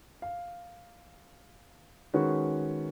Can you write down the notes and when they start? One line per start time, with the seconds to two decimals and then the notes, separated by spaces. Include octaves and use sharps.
0.22 F5
2.14 D#3 G#3 C#4 F#4 B4